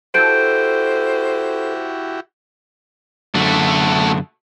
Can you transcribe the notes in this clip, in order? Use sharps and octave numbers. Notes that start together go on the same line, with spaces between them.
E4 F#4 G4 A4 C5 G6 D7
F#2 D3 A3 F#4